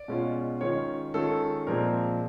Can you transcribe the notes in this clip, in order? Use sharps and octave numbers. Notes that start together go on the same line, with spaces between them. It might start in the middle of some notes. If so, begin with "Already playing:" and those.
Already playing: D5
B2 G#3 C#4 F4
D#3 G#3 C#4 F4 C#5
D#3 G#3 C#4 F4 A4
A#2 F3 G#3 C4 A#4